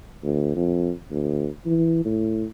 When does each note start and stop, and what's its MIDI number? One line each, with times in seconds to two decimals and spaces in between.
0.23 0.53 38
0.56 0.92 41
1.10 1.49 38
1.66 2.01 52
2.05 2.45 45